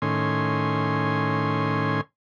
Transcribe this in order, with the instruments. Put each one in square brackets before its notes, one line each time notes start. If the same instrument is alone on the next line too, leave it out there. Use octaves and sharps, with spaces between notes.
[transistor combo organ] A2 D#3 C#4 G#5 C6